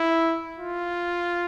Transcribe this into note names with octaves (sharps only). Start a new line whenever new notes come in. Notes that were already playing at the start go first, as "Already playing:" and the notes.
Already playing: E4
F4